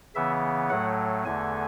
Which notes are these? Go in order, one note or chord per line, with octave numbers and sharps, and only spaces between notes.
C#3 E3 B3 E5
A2 F#3 A3 F#5
E2 D3 A3 G#5